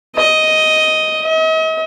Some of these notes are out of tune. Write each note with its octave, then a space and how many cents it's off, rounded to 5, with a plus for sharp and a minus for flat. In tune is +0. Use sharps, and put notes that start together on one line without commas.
D#5 +5
D#5 +45